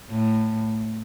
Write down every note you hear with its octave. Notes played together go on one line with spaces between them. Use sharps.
A2